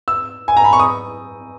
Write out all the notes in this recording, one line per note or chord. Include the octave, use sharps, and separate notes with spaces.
E6
G#5
A#5
B5
C#6
D#6